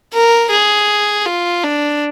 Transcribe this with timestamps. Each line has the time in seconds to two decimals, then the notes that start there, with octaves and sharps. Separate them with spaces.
0.13 A#4
0.51 G#4
1.26 F4
1.63 D4